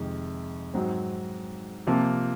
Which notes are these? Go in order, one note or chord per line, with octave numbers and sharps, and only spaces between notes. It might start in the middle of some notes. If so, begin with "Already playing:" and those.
Already playing: F2 C3 D#3 G#3
G#2 F#3 C4
C3 F3 A#3 F4